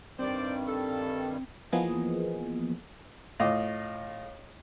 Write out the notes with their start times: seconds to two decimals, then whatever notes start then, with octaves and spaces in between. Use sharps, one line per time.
0.19 G2 D#3 G3 C4 C5 D5
0.68 A4
1.72 E3 F3 A#3 B3 G#4 D#5
3.40 A2 F4 D#5 F5 D6 D#6